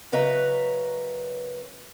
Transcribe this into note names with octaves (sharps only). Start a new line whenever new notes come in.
F#2 C#3 B4 D#5 E5 A#5